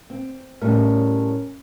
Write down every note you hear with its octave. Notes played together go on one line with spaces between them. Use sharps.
C4
A2 G3 C#4 A#4